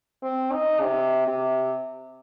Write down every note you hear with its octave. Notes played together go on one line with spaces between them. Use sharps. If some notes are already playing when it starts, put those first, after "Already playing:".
C4
D#4
C3
C3